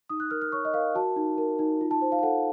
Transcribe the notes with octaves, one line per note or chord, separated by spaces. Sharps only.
D#4 D#6
F#6
A#4 F6
F6
C#5 C#6
D#5
A#4 F5
F#4 A5
D#4
A#4
D#4
F4
A5
C5
F5
A5
A4 F#5